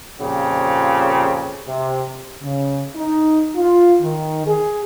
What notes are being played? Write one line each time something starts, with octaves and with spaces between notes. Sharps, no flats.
F2 A#2 C#3 C4 G4
C3
C#3
D#4
F4
D#3
G#4